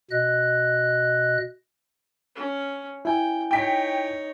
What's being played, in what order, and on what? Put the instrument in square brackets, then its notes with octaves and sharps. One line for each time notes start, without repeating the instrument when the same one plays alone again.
[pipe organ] B2 D#5 F#6
[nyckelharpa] C#4
[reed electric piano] E4 G#5 [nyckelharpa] G5
[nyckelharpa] D#4 C#5 [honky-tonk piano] G5 B6